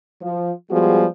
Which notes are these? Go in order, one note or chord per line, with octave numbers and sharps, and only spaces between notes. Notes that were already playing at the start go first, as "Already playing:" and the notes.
F3
F3 G3 G#3 B3 F#4 G#4